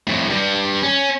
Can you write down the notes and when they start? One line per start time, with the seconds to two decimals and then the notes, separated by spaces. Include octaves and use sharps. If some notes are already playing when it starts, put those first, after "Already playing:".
0.07 F2 A2
0.28 G2 G3
0.83 C#4